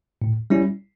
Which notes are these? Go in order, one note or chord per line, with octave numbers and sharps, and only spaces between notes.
A2
G3 C#4 E4